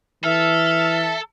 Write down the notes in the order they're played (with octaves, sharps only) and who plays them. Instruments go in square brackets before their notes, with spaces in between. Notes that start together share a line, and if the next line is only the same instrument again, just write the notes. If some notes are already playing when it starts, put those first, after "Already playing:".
[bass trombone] E3 [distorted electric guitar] A4 [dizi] E5 [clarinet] F6